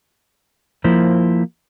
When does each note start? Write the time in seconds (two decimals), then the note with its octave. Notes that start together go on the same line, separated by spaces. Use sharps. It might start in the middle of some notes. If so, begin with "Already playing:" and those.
0.84 F3 A#3 E4 C5